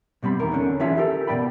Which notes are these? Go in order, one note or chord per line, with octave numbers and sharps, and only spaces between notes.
B2 G3 C4 B5
E2 D#3 A#4
D3 C#4
E3 C#4 D4 F4 G#4 E5
G4 A4 A#4
B2 D#3 D5 G5 B5